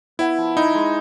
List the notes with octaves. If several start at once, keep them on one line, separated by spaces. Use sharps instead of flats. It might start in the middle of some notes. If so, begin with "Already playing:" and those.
B3 E4
F3
D#4 E4
G#3